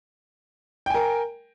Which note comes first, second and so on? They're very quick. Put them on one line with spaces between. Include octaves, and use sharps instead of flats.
G5 G#5 A#4